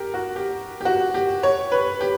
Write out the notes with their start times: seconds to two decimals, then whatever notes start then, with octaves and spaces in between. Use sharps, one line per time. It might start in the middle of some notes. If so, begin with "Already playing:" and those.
Already playing: G4 A#4
0.14 F#4
0.36 G4
0.81 G4
0.85 F#4
1.14 G4
1.43 C#5
1.72 B4
2.01 G4